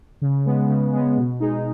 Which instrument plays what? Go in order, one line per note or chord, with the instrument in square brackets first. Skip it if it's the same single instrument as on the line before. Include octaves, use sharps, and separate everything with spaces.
[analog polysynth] C#3
G#3 B3
C#3
G#3 B3
B2
G#3 D#4